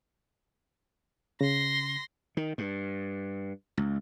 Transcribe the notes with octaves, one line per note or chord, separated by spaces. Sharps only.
C#3 C6 A#6
D#3
G2
C#2